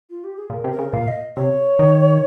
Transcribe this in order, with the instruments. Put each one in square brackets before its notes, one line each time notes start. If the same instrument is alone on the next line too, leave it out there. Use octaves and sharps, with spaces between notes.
[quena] F4
G4
G#4
[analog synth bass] A#2 [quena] A#4
[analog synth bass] C3
[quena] A#4
[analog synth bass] C#3
[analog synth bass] A#2 [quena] F5
[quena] D#5
[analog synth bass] C3 [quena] C#5
[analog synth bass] D#3